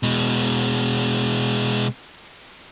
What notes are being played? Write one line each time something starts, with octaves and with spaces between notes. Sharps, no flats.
B2 G#3